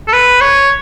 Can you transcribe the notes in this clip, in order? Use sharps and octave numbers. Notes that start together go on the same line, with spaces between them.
A4
B4
C#5